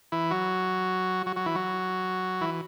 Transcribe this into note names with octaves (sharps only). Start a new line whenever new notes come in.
E3 E4
F#3 F#4
F#3 F#4
F#3 F#4
E3 E4
F#3 F#4
E3 E4